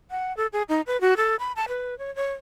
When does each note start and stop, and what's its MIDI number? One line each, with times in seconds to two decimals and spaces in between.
0.11 0.35 78
0.37 0.47 69
0.53 0.62 68
0.69 0.81 63
0.87 1.00 71
1.01 1.14 66
1.17 1.36 69
1.39 1.52 83
1.56 1.65 81
1.68 1.97 71
1.98 2.14 73
2.15 2.32 73